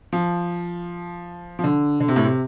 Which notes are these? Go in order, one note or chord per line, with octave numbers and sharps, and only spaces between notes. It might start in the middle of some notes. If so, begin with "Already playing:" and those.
F3
F3
D3
D3
C3
A2
C3